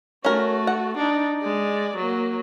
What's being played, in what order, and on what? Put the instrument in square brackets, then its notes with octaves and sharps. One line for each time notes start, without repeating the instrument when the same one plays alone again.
[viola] A3 F#4 [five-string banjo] C#4 A#4
[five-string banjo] F#5
[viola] D4 D#4
G#3 D5
F#3 A#3